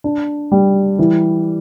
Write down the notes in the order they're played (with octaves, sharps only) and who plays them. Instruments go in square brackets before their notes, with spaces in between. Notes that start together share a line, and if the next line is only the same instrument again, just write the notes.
[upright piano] D4
G3
E3